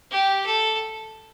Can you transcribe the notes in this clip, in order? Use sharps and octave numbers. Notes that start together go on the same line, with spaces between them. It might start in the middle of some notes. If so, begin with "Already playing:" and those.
G4
A4